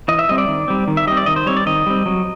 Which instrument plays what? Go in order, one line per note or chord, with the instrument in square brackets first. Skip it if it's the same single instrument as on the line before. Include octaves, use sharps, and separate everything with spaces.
[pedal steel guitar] E3 D#5
E5
G3 C4 D#5
D5
D#3
G3 C4
D#3
E5
G3 C4 D#5
D5
D#3 D#5
C5
G3 C4 C#5
D5
D#3 D#5
G3 C4
F#3